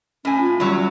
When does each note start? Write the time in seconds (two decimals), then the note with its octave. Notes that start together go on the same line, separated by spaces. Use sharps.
0.25 A2 C#4 G#5
0.41 F4
0.60 E2 F#3 G3